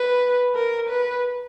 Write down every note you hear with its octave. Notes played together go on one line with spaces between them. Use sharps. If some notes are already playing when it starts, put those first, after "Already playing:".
Already playing: B4
A#4
B4